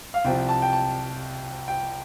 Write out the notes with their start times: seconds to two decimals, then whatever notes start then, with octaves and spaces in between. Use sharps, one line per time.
0.14 F5
0.25 C2 C3 F3 G5
0.49 A5
0.62 G5
0.73 A5
1.68 G5